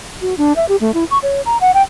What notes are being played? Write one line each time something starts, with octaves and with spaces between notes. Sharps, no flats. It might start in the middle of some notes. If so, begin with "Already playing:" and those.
F#4
D4
E5
G4
A3
E4
C#6
C#5
A#5
F#5
G5